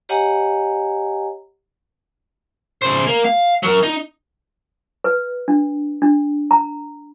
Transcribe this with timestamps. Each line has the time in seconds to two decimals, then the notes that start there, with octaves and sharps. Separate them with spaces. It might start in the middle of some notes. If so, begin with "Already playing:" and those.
0.09 G4 C#5 D#5 F#5 G#5 A#5
2.82 C#3 C5
3.07 A#3
3.25 F5
3.63 F#3 A#4
3.83 D#4
5.04 B4
5.48 D4
6.02 D4
6.51 A#5